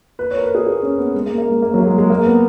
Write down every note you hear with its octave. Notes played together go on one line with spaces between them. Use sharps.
B4
C#5
A#4
B4
G#4
G#4
C#4
B3
G#3
A#3
A#3
G#3
A#3
F#3
A#3
G#3
G#3
A#3
B3